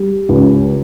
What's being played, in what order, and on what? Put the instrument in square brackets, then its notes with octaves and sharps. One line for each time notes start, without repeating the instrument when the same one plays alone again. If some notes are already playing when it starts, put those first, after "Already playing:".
Already playing: [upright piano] G3
C#2